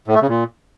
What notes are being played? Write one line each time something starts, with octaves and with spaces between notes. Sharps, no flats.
A2
A3
C#3
A#2